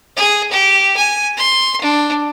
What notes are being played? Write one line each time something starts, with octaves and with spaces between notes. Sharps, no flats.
G#4
G4
G#5
C6
D4